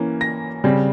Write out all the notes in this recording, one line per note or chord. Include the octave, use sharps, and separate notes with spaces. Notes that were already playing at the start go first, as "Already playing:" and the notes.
Already playing: E3 A#3 C#4
A#6
C#3 G3 C4